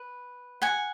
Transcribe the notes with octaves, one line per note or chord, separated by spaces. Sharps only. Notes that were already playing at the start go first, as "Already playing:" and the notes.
Already playing: B4
F#5 G#5